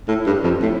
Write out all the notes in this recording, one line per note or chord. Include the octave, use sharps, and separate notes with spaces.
A2
G2
F2
A2